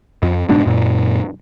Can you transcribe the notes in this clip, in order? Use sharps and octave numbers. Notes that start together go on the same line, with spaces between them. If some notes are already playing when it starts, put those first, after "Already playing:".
F2
F#1 G#2 B2 D4
F#2 A#2